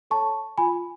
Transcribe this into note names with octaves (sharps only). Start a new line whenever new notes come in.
A4 C#5 A5 C#6
F4 G#5 B5